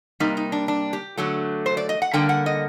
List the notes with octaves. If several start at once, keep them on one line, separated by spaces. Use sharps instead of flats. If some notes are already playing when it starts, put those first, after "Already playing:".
C3 G3 A#3 D#4
D#4
D4
D4
G4
D3 F#3 A3
C5
D5
D#5
F#5
D3 G3 A#3 G5
F#5
D#5